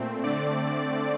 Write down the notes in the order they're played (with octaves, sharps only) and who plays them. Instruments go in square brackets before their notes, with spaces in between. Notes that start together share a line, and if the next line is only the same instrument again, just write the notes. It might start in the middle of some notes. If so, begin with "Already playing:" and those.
Already playing: [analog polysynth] A#2 A3 C4
D3 A3 C4 D5